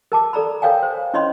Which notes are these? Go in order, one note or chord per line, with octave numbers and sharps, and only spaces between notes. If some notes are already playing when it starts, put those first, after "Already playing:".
A#4 A5 D6
A4 D5 A#5 B5
A4 A#4 C#5 F5 G5 G#5
C5
C#4 E4 C#5 D#5 B5 C6